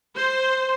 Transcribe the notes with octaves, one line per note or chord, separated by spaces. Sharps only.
C5